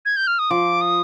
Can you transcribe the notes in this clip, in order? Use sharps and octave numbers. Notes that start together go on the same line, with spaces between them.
G#6
G6
F6
D#6
F3 D6
D#6